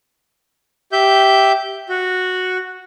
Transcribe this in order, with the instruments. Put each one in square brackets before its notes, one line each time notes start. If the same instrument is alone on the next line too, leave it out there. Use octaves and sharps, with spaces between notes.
[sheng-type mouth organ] G4 E5 G6
F#4